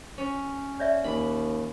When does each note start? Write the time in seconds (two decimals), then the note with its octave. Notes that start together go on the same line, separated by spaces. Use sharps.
0.18 C#4
0.80 C#5 D5 E5
1.04 D#2 B5